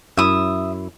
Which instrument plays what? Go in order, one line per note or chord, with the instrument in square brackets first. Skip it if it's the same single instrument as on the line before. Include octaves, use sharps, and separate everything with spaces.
[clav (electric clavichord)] F#2 E4 [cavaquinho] E5 D#6